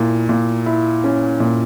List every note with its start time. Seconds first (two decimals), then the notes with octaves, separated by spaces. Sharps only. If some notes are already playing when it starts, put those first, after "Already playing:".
Already playing: A#2 E4
0.29 A#2
0.66 E4
1.04 C#4
1.40 A#2